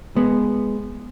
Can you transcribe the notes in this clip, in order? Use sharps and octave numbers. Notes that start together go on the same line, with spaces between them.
G#3 B3